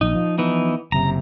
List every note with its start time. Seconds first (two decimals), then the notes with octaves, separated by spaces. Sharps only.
0.01 A#1 D#4
0.15 F3
0.38 E3 B3 D#4
0.92 F#1 C3 A#5